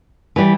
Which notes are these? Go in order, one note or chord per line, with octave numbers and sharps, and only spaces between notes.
E3 G3